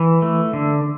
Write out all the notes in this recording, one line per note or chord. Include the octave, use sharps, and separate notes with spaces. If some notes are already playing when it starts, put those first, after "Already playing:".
Already playing: E3
A3
D3